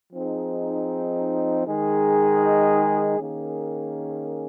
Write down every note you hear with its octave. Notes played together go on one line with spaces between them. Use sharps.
F3 C4 D#4 G#4
D#3 G#3 D#4 G#4
D#3 A#3 C#4 G#4